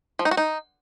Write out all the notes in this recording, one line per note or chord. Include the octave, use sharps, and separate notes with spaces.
F3
D#4
F#4
D#4